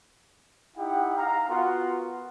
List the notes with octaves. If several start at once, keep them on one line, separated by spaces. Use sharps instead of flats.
D#4 E4 G4 F#5 G5
F5 A#5
B3 F4 F#4 A#4 F#5